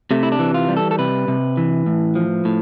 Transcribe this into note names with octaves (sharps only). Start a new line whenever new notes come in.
C3 A3
E4
D4
E3
F4
G3
A4
A4
C3 B4
C3
E3
A2
F3
A2